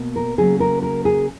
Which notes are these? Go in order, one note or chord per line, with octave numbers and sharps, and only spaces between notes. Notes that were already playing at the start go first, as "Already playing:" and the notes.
Already playing: B2 A#3
A#4
C#3 F#3 A#3 G#4
A#4
A#4
G#4